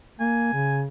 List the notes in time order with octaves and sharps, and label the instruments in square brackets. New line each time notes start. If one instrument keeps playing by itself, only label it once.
[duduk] A#3 [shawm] G#5
[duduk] C#3